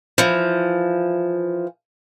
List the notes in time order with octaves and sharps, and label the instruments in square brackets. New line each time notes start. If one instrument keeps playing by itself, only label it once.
[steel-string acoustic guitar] E3 F3